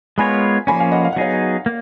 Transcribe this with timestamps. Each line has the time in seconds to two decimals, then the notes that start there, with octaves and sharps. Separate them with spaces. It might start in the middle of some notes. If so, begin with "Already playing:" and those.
0.18 G#3 B3 F4 A#4 C#5 G#5 B5
0.67 F3 A#3 C#4 G#5 B5
0.80 F5 G#5
0.92 D#5 F#5
1.05 F5
1.13 F#5
1.16 F#3 B3 D#4 G#4 C#5 F5
1.66 A#3